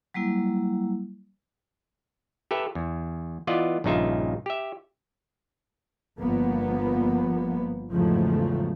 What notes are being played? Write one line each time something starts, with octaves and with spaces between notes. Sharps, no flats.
F#3 G3 A#3 E4
G4 A4 B4 E5
E2
E3 B3 F4 D5 D#5
A#1 G2 C#3 D#4 F4 E5
G4 E5
G1 F3 A#3 B3
E2 G#2 C#3 F3 F#3 A3